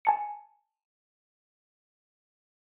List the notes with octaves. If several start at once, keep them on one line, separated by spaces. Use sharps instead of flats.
G#5 A5 C#7